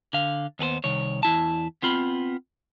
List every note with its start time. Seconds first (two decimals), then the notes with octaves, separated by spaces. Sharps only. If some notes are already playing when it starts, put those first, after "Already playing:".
0.13 D3 F5
0.59 D#2 B3 G#4 C5
0.84 C2 D#3 C#5
1.23 E2 E4 A5
1.82 B3 C4 F4 B5